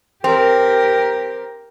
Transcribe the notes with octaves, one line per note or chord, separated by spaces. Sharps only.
C4 G4 A#4